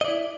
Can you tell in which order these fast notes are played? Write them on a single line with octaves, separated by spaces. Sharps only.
D#5 D5 E4